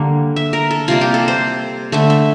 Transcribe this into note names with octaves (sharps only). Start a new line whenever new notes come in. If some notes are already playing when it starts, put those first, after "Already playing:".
Already playing: D3 G3 A#3
E5
A#4
A4
C3 G3 A#3 F4
G4
A4
C5
D3 A3 E5
E5